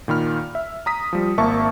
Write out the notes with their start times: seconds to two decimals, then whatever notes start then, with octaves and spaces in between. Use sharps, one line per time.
0.08 A#2 D#3 B5 F6
0.55 E5
0.86 A#5 D#6 B6
1.13 F3 G3
1.38 G#1 A#3 E5 A5 C#6